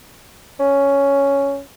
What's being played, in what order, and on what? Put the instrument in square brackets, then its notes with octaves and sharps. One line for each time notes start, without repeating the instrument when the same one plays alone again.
[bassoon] C#4